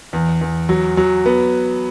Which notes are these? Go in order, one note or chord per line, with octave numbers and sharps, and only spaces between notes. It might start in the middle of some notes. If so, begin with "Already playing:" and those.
E2
E2
F#3
F#3
B3